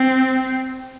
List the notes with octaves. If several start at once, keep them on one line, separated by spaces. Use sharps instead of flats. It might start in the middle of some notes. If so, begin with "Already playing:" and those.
Already playing: C4